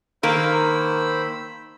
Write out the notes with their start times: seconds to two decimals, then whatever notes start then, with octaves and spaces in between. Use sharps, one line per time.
0.23 D#3 A#3 C5 B5 E6